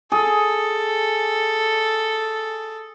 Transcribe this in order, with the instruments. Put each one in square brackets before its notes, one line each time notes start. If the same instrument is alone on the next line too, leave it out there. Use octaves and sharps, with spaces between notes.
[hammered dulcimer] G#4 [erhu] A4